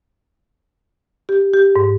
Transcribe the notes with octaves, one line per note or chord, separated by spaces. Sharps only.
G4
G4
G#2